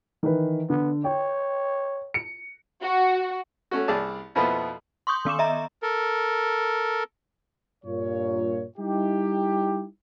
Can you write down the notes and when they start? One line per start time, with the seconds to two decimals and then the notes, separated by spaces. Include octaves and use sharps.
0.23 D#3 E3 B4
0.70 D3 B3
1.04 C#5 G5
2.14 C#7
2.83 F#4
3.71 A3 C#4 F#4
3.88 C2 G#4 D5 A5
4.35 F2 B2 F3 B3 E4 B4
5.07 C6 C#6 D#6 G6
5.25 D#3 B3 D6 E7
5.39 D#5 E5 A#5
5.82 A4 A#4
7.85 G2 A#2 F4 C#5
8.78 G3 D#4 E4 G4